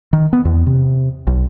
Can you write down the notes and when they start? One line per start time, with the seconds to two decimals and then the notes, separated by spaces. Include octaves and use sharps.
0.13 D#3
0.33 B3
0.45 E2
0.67 C3
1.27 B1